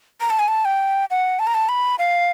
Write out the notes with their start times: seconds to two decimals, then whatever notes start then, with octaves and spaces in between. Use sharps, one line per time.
0.21 A#5
0.30 A5
0.39 G#5
0.48 A5
0.65 G5
1.10 F#5
1.39 A5
1.47 A#5
1.54 A5
1.69 B5
1.99 F5